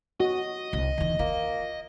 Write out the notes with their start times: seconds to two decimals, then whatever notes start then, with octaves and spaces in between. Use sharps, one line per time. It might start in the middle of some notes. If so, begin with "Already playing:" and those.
0.20 F#4 D#5
0.73 C2
0.98 E2 D#3
1.19 A#3 F4